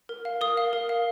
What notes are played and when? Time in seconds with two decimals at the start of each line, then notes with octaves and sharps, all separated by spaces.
0.09 A#4
0.25 F5
0.41 A#4 D#6
0.57 F5
0.73 A#4
0.89 F5